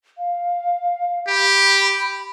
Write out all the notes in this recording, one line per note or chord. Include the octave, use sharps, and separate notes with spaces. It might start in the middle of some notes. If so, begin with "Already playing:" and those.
F5
G4 B5